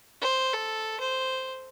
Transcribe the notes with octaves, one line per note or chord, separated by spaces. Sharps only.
C5
A4
C5